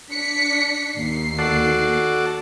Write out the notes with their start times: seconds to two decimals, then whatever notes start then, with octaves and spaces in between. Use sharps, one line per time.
0.12 D4 B6 C#7
0.92 D#2 C7
1.39 F#4 A4 D5